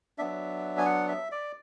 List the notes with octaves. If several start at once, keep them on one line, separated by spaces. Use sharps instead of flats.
F#3 B3 D4 E5
G#5
F#5
E5
D5